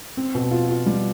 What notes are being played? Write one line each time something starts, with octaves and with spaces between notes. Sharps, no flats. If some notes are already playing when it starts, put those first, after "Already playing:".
C4
B2
F4
F4
G3